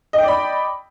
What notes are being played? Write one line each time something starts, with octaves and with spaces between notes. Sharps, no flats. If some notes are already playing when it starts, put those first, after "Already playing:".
D5 D#5 G5 B5